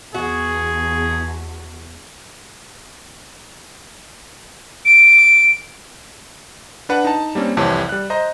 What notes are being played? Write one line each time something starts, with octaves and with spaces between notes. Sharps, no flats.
E2 F#4 G#4
D7
D4 B4 F#5
D#4 A5
G3 A#3 C4 C#4
C2 F2 C3 E3 C#5 A5
G3 F#6
C5 D#5 A#5